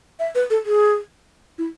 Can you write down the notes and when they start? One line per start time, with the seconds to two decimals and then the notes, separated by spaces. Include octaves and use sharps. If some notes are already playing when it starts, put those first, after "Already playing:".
0.19 E5
0.35 B4
0.50 A4
0.66 G#4
1.58 E4